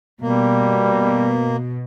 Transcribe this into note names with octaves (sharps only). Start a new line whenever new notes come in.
B2 G3 A#3